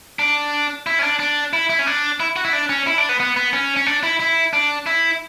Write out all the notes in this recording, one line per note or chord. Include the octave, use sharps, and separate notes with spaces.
D4
E4
C#4
D4
D4
E4
E4
C#4
D4
E4
F#4
E4
D4
C#4
E4
D4
B3
B3
B3
C#4
C#4
D4
E4
E4
D4
E4